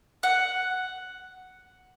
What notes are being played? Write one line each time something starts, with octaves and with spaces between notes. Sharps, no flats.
F#5